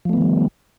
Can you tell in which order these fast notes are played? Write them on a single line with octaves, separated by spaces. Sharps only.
F3 A3 B3 D#3 G3